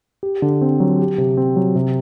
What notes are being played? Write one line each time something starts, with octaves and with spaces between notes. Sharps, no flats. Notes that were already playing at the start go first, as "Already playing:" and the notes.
G4
D3
C4
F#3
G4
C3
C4
F#3
C3